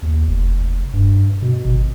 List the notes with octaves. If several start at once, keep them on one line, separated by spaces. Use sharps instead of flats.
D#2
F1
G2
B2
G#1